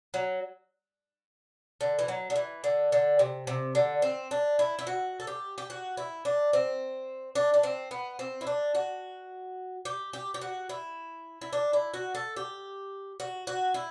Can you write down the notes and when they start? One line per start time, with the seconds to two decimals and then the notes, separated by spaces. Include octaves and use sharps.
0.14 F#3
1.81 D3
1.99 E3
2.08 F#3
2.30 D3
2.36 E3
2.64 D3
2.92 D3
3.19 C3
3.47 C3
3.75 D3
4.02 C4
4.31 D4
4.59 E4
4.79 E4
4.87 F#4
5.20 A4
5.27 G4
5.58 G4
5.70 F#4
5.97 E4
6.25 D4
6.53 C4
7.35 D4
7.54 D4
7.63 C4
7.91 B3
8.19 C4
8.41 E4
8.47 D4
8.75 F#4
9.85 G4
10.13 G4
10.34 G4
10.41 F#4
10.69 E4
11.41 E4
11.53 D4
11.73 E4
11.94 F#4
12.15 A4
12.36 G4
13.20 F#4
13.47 F#4
13.74 E4